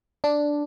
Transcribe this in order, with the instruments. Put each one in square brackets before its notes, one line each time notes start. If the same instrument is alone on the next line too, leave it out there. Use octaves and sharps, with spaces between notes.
[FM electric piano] D4